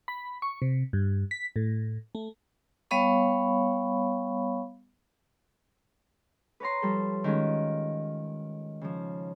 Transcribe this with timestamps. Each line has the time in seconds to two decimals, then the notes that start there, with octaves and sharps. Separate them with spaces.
0.08 B5
0.42 C#6
0.62 C3
0.93 G2
1.31 B6
1.56 A2
2.15 A3
2.91 G3 B3 C#5 F5 B5 C#6
6.60 B4 C#5 A#5 C6
6.82 F3 G3 A4
7.24 D#3 G#3 C#4 F4
8.81 C#3 F3